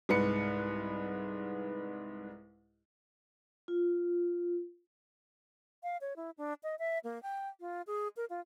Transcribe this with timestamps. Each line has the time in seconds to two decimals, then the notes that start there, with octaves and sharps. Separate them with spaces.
0.09 C2 G#2 B4 C#7
3.68 F4
5.83 F5
6.01 C#5
6.16 E4
6.38 D4
6.63 D#5
6.79 E5
7.04 A#3
7.23 G5
7.60 F4
7.87 G#4
8.17 A#4
8.30 F4